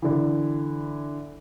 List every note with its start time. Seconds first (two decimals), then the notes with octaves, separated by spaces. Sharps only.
0.02 D3 E3